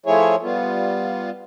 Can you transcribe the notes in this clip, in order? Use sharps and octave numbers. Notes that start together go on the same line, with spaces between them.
F3 A3 E4 G#4 C#5
G3 B3 F4